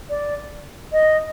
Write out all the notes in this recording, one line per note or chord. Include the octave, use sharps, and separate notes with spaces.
D5
D#5